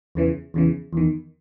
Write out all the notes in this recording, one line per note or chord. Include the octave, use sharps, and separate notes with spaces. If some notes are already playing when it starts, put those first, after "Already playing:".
E2 C#3 E3
E2 C#3 E3
E2 D#3